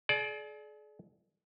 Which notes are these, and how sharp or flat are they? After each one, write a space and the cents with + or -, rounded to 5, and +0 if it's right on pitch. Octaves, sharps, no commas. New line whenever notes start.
G#4 +45 D5 +0